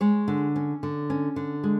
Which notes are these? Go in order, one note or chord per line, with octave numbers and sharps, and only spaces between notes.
G#3 C#5
D3
C#4
D3
C#4
D3
G#3